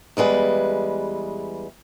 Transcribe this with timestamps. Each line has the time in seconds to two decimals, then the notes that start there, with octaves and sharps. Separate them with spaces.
0.17 E2 G3 G#3 B4